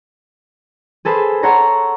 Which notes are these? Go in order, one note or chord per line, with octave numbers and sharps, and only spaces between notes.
G#4 A4 B4 C5
A4 C#5 F#5 A#5 C6